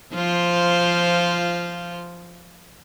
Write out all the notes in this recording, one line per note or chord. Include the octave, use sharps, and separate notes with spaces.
F3 F4 C5